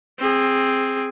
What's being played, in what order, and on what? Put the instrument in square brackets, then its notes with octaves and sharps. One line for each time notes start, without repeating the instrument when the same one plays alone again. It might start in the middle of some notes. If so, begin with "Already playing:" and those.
[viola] C4 G#4